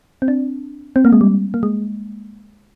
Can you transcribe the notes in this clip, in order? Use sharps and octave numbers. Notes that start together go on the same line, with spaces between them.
C4
D4
C4
A#3
G#3
G3
A#3
G#3